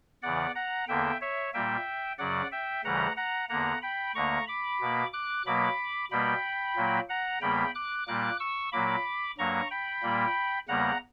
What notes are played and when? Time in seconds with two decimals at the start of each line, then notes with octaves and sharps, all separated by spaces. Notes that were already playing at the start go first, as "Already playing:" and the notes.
0.22 E2 C#3 E3 D5 F#5
0.55 F#5 A#5
0.88 E2 D3 A#3 E5 G5
1.21 C#5 E5
1.54 A#2 G3 A#3 E5 G5
2.18 F#2 C#3 F#3 D5 F#5
2.52 E5 G5
2.84 D2 C#3 E3 G3 F#5 A#5
3.16 F#5 A#5
3.49 E2 D3 A#3 F#5 A#5
3.82 G5 B5
4.14 D2 D3 A#3 A#5 C#6
4.47 B5 D6
4.81 B2 A#3
5.13 D6 F#6
5.46 B2 F#3 A#3 B5 D6
6.11 B2 G3 A#3 G5 B5
6.76 A#2 F#3 A#3
7.09 F#5 A#5
7.41 E2 C#3 G3 A#3 G5 B5
7.75 D6 F#6
8.07 A#2 G3 A#3 D6 F#6
8.39 C#6 E6
8.72 A#2 F#3 A#3 B5 D6
9.38 G2 F#3 A#3 A#5 C#6
9.71 G5 B5
10.03 A#2 G3 A#3
10.68 E2 C#3 G3 A#3 F#5 A#5